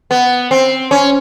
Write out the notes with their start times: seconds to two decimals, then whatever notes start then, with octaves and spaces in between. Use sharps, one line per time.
0.11 B3
0.51 C4
0.91 C#4